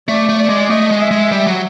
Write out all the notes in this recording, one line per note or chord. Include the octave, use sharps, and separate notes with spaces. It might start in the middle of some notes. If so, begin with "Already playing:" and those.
A3 D5
A3
D5
G#3
A3 D#5
G#3
E5
G#3
G3
F#3